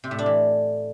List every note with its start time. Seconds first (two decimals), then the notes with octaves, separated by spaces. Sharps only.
0.04 C3
0.11 A2
0.19 D4
0.26 E3